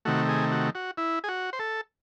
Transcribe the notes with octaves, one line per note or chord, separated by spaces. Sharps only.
C3 D#3 A3 F#4
G#4
F#4
F#4
E4
G#4
F#4
C5
A4